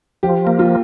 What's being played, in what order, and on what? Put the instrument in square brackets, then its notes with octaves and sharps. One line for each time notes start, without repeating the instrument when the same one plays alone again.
[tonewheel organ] F3 [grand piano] G4
[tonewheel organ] A#3
[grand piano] F4